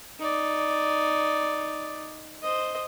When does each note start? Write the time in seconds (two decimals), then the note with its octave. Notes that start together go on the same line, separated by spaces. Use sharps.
0.19 D#4 D5
2.42 C5 D#5